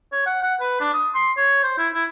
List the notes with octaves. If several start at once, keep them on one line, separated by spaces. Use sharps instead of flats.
C#5
F#5
F#5
B4
D4
D#6
C6
C#5
C5
E4
E4